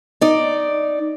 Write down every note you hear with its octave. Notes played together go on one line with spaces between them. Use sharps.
D#4 D5